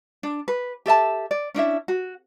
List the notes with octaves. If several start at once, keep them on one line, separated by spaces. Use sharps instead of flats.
D4
B4
G4 A4 E5 A5
D5
C#4 D4 E4 E5
F#4